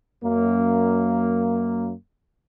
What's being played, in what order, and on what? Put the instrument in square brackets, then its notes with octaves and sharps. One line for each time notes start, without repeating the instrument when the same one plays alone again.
[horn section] F#2 A#3